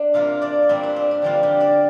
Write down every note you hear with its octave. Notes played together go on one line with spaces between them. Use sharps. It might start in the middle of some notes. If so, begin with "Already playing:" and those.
Already playing: D4
C3 A#3 F4 F5
D4 D5
A#2 G3 A#3 C4
D4
C4
D4
D3 F3 G3 A#3 F4
G3 G4
D4 D5